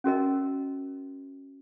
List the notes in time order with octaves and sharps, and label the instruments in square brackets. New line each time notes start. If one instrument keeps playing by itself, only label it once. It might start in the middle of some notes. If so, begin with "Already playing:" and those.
[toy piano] C#4 F#4 A#4 D#5